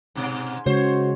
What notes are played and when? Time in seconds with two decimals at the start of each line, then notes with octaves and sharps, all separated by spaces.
0.15 G#2 B2
0.66 C#3 G#3 F#4 C5 C#5